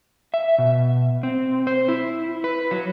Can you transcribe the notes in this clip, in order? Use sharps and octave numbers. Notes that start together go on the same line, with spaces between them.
E5
B2
C4
C5
E4
B4
F#3